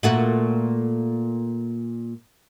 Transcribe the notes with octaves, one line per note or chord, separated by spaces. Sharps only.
A#2 A3 F#4